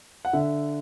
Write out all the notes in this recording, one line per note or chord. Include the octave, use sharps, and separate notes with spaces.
F#5
D3 E5